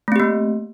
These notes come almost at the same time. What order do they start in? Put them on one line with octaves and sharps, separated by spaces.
A3 C4 G4 A#3